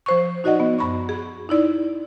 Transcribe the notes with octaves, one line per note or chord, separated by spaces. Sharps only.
F3 C5 C#6
D#4 F#4 D5 D#5 F#5
B3
F#2 B5 C#6
G#4
D#4 E4 D5